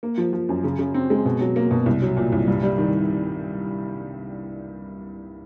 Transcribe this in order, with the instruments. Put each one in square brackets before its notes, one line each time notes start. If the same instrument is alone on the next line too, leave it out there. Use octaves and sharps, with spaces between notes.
[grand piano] A#3
F3
F3
F#2
C#3
C#3
C4
G#3
B2
F#3
A#3
B2
C2
F#3
A#2
C2
G2
G3
D#3